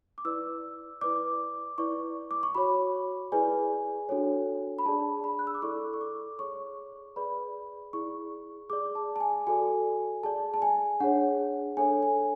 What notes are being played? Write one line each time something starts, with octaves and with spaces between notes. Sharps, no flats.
D6
E4 B4 D5 E6
E4 B4 D5 D6
E4 B4 D5 C#6
D6
C#6
F#4 C#5 B5
E4 G#4 B4 D5 G#5
D4 F#4 A4 C#5
B5
D4 G#4 D5 A5
B5
F#6
E6
D6
E4 A4 D5 C#6
C#6
D6
G#4 C#5 C#6
G#4 B4 D5 B5
E4 G#4 D5 C#6
G#4 D5 D6
A5
A5
G#5
F#4 A4 D5 G#5
G#4 D5 A5
A5
G#5
D4 G#4 C#5 F#5
D4 A4 C#5 G#5
G#5